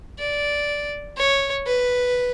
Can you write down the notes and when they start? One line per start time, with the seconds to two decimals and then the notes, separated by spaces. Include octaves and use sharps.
0.19 D5
1.17 C#5
1.67 B4